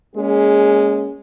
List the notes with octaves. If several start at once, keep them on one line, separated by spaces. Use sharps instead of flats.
G#3 A#3 C#4 G#4